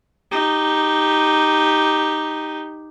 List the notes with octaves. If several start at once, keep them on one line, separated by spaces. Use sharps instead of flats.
D#4 G4